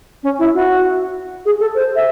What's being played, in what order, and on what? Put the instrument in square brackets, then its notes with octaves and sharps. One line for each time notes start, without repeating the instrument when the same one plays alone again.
[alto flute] C#4
E4
F#4
G#4
A4
C5
E5